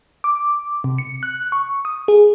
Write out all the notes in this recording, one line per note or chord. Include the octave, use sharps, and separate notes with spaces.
D6
C3
C#7
F#6
C#6
D#6
G#4